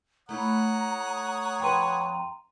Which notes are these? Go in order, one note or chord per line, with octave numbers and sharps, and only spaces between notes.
A3 E4 C#5 F#5 A#5 D#6
F2 B4 G5 C6 D#7